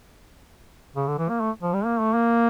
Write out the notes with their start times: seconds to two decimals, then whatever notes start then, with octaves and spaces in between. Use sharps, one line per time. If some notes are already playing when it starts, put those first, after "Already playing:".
0.96 C#3
1.07 D3
1.18 E3
1.29 A#3
1.41 A3
1.63 F3
1.74 G3
1.85 A#3
2.00 A3
2.15 A#3